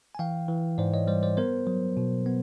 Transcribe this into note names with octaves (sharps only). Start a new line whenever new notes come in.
G#5
E3 F5 G5
E3
G#2 C5 D5
C#5 D#5
G3 C5 D5
C5 D5
B3 A#4 C5
F#3
B2
B3